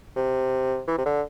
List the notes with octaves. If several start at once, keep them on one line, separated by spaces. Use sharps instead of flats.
C3
E3
C3
D3